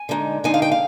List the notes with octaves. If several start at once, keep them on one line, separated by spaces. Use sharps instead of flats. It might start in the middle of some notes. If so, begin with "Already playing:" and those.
Already playing: G#5
D3 G#3 D#4
D3 G#3 D#4 G#5
F5
G5
F5